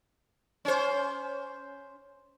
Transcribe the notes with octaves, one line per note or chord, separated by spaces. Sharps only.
C#4 C5